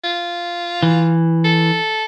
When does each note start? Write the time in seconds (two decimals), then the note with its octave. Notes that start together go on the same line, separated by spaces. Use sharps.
0.04 F4
0.83 E3
1.44 A4